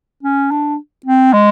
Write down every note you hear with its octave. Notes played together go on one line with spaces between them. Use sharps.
C#4
D4
C4
G#3